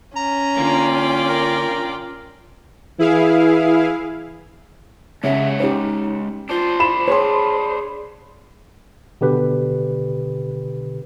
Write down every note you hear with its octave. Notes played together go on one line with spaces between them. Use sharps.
C#4 A#5
D3 E3 A#3 F4 D5 G5
A#4
E3 E4 G#4 F5
C#3 G#3 C#5 E5 F#5
C#4 D#4 G4
D4 F4 C5
B5 E7
G#4 C#5 C6
B2 D3 G4 B4